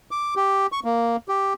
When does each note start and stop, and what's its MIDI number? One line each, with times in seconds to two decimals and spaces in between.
0.11 0.34 86
0.36 0.67 67
0.72 0.80 85
0.84 1.17 58
1.29 1.54 67